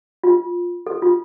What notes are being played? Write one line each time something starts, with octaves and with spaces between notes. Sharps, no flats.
F4
A4
F4